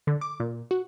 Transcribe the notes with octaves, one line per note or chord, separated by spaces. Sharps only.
D3
D6
A#2
F#4